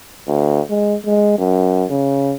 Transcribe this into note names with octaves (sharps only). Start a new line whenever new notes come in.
D2
G#3
G#3
F#2
C#3